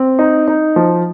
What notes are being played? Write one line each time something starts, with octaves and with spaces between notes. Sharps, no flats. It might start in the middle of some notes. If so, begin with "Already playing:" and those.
Already playing: C4
D#4
D#4
F3